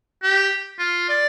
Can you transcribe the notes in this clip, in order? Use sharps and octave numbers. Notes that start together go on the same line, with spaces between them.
G4
F4
D5